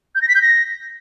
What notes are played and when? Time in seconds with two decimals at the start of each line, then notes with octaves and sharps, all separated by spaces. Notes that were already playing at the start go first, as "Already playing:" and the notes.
0.15 G6
0.22 A#6
0.28 B6
0.35 G6
0.42 A#6